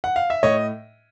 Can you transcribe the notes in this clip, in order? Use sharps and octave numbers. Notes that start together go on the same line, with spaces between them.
F#5
F5
E5
A2 C#5 D#5